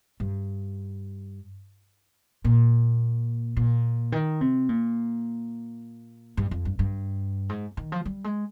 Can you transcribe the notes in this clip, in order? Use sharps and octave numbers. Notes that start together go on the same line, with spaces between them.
G2
A#2
A#2
D#3
C3
A#2
G2
F2
G2
G2
G#2
D#3
F3
G3
G#3